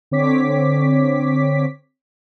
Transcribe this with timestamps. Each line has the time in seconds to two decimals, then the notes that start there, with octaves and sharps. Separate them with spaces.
0.11 D3 C4 C#5 D6 B6